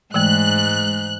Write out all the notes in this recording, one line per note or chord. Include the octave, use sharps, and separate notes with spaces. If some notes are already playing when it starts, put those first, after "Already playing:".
G#2 E3 G#3 A3 F#6